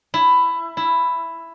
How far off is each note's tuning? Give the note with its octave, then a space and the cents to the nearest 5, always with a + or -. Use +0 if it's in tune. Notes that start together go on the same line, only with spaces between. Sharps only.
E4 +10
E4 +5